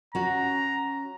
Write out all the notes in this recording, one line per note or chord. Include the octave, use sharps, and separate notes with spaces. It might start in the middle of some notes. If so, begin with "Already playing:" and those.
C#4 F#4 A#5